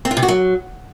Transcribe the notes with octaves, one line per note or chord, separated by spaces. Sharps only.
C4
F4
C3
F#4
F#3